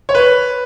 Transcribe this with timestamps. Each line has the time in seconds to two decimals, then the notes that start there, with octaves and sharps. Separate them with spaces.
0.09 C#5
0.15 B4